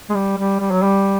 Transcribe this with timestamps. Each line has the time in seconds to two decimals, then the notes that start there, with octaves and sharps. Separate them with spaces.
0.10 G#3
0.14 G3
0.37 G3
0.60 G3
0.71 F#3
0.83 G3